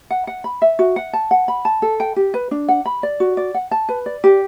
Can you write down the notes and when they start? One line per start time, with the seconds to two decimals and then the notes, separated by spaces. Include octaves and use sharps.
0.11 F#5
0.27 F#5
0.44 B5
0.62 E5
0.79 F#4
0.96 F#5
1.13 A5
1.31 F#5
1.48 B5
1.65 A5
1.82 A4
2.00 G5
2.16 G4
2.34 B4
2.51 D4
2.68 F#5
2.86 B5
3.03 D5
3.20 F#4
3.37 D5
3.54 F#5
3.71 A5
3.89 B4
4.06 D5
4.24 G4